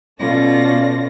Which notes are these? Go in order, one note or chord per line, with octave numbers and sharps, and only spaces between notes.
B2 C#4 F4 A4 D5 A#6